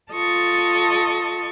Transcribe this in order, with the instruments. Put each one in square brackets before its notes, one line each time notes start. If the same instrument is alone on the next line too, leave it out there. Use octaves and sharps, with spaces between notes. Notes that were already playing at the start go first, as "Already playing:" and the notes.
[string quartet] F4 A4 D#5 A5 C#6